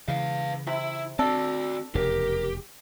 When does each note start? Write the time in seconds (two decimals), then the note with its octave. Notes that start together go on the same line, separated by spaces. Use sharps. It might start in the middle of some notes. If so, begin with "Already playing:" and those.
0.08 C#3 E3 B4 F5
0.67 C3 E4
1.19 C4 D4 F#4 A4 D5
1.95 F1 E2 C#3 G4 A#4